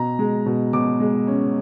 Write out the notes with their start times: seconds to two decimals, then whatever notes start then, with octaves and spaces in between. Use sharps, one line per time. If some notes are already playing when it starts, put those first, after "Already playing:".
Already playing: B2 A#5
0.19 G#3
0.46 B2
0.73 B2 D6
1.00 G#3
1.27 C#4